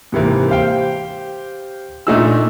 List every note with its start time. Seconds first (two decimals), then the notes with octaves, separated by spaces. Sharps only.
0.12 G#2 C3 E3 A#3
0.48 G4 C5 F5 G5
2.07 A#2 A3 D4 D#4 G#4 E6